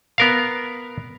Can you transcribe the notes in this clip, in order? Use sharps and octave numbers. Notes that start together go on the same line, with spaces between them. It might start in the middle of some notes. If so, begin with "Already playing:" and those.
B3 A#4 F5